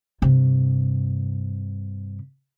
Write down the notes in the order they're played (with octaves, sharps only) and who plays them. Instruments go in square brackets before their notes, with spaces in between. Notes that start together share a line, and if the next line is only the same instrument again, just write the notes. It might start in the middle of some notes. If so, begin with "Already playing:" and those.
[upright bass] G2 C3